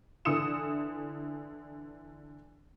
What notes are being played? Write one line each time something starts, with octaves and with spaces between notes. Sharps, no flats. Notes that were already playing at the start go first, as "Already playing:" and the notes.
D3 E3 D#6 E6 C#7 E7